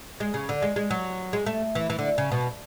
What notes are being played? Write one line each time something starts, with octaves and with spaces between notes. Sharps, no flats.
G#3
C#3
D3
G#3
G#3
F#3
G#3
A3
E3
E3
D3
C#3
B2